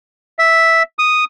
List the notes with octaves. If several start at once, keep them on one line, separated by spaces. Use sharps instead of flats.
E5
D#6